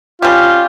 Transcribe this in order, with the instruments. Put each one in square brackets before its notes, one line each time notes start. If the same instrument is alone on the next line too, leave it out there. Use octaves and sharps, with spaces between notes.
[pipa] G3 C#4 G4 [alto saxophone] F4